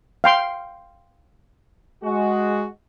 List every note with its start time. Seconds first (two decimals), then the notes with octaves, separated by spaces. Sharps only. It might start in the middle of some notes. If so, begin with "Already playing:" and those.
0.24 F5 G5 C6
2.04 G#3 F#4